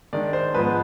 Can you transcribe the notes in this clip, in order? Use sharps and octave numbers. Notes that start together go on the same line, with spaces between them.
D#3 G#3 D4 D5
C5
G#2 F3 G#3 B3 B4